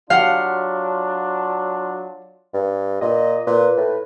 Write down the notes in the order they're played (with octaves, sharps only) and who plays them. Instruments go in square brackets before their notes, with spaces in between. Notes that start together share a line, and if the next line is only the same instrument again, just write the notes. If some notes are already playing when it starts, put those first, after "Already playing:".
[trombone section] F#3 D4 F4 [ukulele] G4 F#5 [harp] F5
[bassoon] G2
[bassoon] A#2 [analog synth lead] D#5
[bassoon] A#2 [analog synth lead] B4
[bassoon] A2